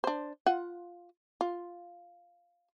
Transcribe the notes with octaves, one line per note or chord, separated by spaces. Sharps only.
D4 C5
F4 F#5
F4